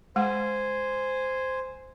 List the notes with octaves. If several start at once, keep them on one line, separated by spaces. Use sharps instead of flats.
G#3 C5 F#5 G#5